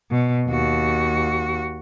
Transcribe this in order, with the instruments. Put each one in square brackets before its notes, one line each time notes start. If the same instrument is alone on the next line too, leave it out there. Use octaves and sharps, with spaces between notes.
[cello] B2
D#2 F#4